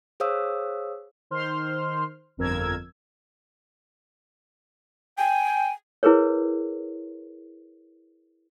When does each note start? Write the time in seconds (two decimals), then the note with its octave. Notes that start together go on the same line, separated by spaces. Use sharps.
0.20 G#4 C5 C#5 F5 D#6 E6
1.31 D#3 C5 C6 F6
2.37 G1 F2 A#4 E6 G#6
5.18 G5 G#5
6.03 E4 G#4 A#4 B4 C#5